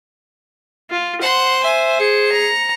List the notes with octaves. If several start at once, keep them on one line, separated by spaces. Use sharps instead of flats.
F4
C5 F#5 C6
E5 G#5
G#4 C#7
A#5